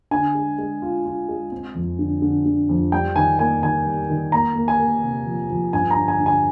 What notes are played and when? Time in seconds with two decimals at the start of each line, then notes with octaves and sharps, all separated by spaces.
0.11 D3 G#5
0.35 G#3
0.58 G#3
0.82 F4
1.05 F4
1.29 G#3
1.52 C4
1.75 F2
1.99 D3
2.22 D3
2.45 D3
2.69 F2
2.92 G3 G5
3.16 D#3 G#5
3.39 A#3 G#5
3.63 D#3 G#5
3.86 G3
4.10 D#3
4.32 A#3 A#5
4.55 A#3
4.68 G#5
4.80 A#3
5.03 C3
5.26 F3
5.50 F3
5.73 G2 G#5
5.91 A#5
5.96 D3
6.08 G#5
6.20 D3
6.26 G#5